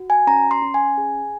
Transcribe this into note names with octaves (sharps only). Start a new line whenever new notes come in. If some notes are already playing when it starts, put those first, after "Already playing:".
Already playing: F#4
G#5
C#4 A#5
C6
C#4
G#5
G#4